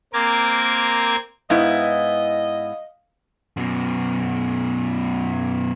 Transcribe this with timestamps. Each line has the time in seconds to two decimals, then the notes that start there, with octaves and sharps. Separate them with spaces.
0.13 A#3 C4 A#4 D6 G#6
1.50 G#2 B3 E4 D#5 F5
3.57 F#2 B2